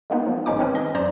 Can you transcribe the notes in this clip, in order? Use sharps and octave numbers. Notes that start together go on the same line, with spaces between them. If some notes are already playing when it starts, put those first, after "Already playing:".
G#3 A#3 B3 D#4
F3
G#1 D#3 G#3 C#4 D#4 D6
C4 C#4 B4
D#5
F#2 C5 D5 A#5